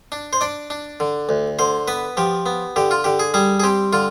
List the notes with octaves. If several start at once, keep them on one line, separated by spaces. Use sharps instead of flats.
D4
C5
D4 D5
D4
D3
D2
D3 C5
B3 B4
F3 G4
B3
D3 G4
F4
D3 G4
G#4
G3 G#4
G#4
C4 G4
D3 F4